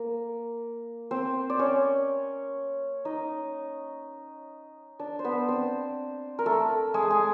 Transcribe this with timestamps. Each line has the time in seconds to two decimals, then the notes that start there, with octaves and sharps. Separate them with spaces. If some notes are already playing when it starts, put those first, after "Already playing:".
Already playing: A#3 A#4
1.11 C4 C5
1.50 D5
1.59 C#4 C#5
3.05 D#4 D#5
4.99 D4 D5
5.19 C5
5.24 B3 B4
5.49 C4 C5
6.39 A#4
6.46 A3 A4
6.94 G#3 G#4
7.10 G#3 G#4